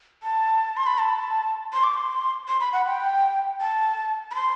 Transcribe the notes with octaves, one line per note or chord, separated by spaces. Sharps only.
A5
C6
B5
A5
C6
D6
C6
C6
B5
F#5
G5
A5
B5
C6